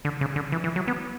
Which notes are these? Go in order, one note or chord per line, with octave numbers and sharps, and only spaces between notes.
D3
C#3
D3
E3
E3
F#3
B3